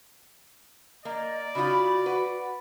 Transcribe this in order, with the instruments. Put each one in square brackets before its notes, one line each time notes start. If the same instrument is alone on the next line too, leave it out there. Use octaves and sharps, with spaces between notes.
[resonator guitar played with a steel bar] A#3 [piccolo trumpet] D5 [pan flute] D#5
[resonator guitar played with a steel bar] C#3 D#4 F4 [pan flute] F#4 [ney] B5
[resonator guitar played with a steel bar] B4 [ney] F#5